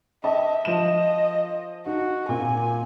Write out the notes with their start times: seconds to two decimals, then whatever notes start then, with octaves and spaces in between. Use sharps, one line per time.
0.24 D#5 E5 G5 A5
0.65 F3 D#5 E7
1.86 D#4 F#4
2.29 A#2 C4 G#5